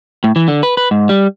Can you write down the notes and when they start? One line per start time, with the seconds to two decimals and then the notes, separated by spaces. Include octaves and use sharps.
0.24 A2
0.36 E3
0.48 D3
0.63 B4
0.77 B4
0.91 G#2
1.09 G3